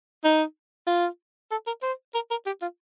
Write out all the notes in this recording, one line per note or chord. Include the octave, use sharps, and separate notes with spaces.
D#4
F4
A4
A#4
C5
A#4
A#4
G4
F4